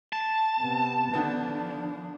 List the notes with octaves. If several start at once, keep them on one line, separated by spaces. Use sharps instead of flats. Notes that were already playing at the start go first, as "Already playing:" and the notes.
A5
C3 B3
D3 D#3 F3 B3 D4